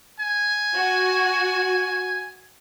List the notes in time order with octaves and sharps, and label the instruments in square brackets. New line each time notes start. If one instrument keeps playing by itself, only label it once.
[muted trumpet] G#5
[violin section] F#4